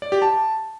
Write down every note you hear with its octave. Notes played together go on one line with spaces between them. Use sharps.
D5
G4
A5